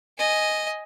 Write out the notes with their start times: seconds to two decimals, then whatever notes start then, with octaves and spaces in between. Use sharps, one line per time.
0.18 D#5 G#5